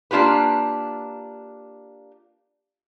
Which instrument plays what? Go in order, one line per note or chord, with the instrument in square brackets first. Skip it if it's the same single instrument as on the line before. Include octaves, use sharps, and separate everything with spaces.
[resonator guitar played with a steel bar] A#3 D4 F4 G4 B4